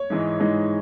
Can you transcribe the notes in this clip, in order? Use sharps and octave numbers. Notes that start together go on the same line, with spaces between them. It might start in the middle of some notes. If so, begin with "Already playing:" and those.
Already playing: C#5
G#2 E3 G#3 D#4
G#2 E3 G#3 D#4